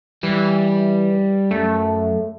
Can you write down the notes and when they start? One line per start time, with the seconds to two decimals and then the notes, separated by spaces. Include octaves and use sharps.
0.23 E3 G3
1.51 F#2 A3